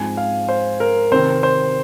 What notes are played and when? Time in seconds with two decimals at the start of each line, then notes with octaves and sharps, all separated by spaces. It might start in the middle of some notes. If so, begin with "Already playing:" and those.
Already playing: G#2 F3 G#3 C4 G#5
0.17 F5
0.49 C5
0.80 A#4
1.12 C3 D#3 C4 C5
1.43 C5